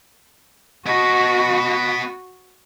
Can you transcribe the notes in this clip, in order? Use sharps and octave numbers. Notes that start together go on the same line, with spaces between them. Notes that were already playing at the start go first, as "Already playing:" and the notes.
B3 F#4 D#5